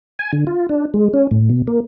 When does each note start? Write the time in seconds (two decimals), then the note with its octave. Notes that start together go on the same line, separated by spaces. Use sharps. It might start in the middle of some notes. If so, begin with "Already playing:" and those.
0.19 G#5
0.33 D3
0.47 F4
0.69 D4
0.94 G#3
1.13 C#4
1.31 A2
1.50 B2
1.67 A#3